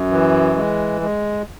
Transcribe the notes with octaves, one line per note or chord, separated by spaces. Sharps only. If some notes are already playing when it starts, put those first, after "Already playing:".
Already playing: F#2
E3
G#3
G#3